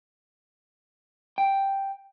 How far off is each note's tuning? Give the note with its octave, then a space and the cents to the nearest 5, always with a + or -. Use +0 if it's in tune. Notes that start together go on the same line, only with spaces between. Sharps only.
G5 +0